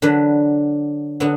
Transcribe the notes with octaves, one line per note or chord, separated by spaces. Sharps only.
D3 F#3 D4 B4
D3 F#3 B3